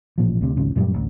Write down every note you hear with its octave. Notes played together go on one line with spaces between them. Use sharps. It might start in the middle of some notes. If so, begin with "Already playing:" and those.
A1 A#2 F3
D2 C3
G#1 C#2 C#3
F#2 A#2 F#3 G3
A1 D2